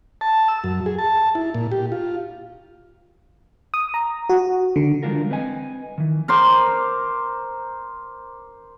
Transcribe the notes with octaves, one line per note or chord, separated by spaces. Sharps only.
A5
E6
F#2
G#4
A5
E4
A#2
G4
F4
D#6
A#5
F#4
D3
E3 G3 G#3 D4 F4 A#4
C4 B4 D#5 G#5
D#3 E3
A#4 C5 C6 D6